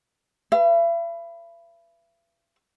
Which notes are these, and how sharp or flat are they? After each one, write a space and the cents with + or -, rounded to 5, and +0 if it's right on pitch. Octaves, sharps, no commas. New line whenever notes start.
B4 +0 E5 +45